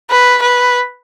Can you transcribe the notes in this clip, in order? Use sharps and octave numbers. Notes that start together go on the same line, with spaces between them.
B4
B4